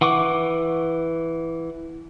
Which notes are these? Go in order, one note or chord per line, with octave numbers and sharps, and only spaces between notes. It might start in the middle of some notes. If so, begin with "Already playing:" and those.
E3 F#5 C#6 D6